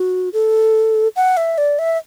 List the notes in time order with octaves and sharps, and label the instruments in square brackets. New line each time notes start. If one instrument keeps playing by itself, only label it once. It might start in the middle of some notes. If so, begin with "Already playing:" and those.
Already playing: [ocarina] F#4
A4
F#5
E5
D5
E5